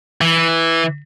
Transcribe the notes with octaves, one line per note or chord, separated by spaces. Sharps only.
E3